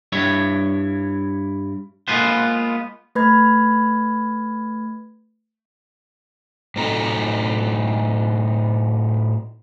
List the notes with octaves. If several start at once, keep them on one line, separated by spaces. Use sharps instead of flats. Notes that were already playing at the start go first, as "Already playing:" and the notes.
G2 E4 C#5
G#3 A#3 B3 F4 B4 C5
A3 B4 B5 G#6
A2 F#3 C4 D#4 A4 A#5